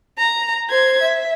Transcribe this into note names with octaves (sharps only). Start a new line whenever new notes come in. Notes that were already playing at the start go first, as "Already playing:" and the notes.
A#5
C5 G#6
E5